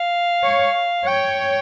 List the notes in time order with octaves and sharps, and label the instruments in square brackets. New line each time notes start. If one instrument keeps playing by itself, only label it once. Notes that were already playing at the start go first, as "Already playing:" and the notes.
Already playing: [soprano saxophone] F5
[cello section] C#5
[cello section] C#5 [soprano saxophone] G5